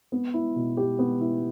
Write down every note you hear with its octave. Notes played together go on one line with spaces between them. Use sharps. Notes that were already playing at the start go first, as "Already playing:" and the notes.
B3
E4
B2
G4
B3
E4